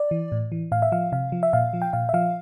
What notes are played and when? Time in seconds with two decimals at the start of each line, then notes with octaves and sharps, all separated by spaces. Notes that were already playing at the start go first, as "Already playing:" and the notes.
Already playing: D5
0.11 E3
0.32 A2
0.52 E3
0.72 A2 F5
0.82 E5
0.92 F3 F5
1.12 C3 F5
1.32 F3
1.43 E5
1.53 A#2 F5
1.73 F3
1.82 G5
1.93 A#2 F5
2.09 E5
2.14 F3 F5